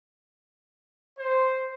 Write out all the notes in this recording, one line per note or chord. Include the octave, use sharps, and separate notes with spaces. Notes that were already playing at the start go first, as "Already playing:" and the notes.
C5